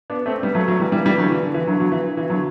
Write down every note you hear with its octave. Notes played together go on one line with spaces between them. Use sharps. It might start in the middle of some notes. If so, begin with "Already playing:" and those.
B3 D4
A3 C4
G3 B3
F#3 A3
F#3 A3
E3 G3
E3 G3
E3 G3
D3 F#3
E3
D3
E3
D3 F#3
D3 F#3
E3
E3
D3 F#3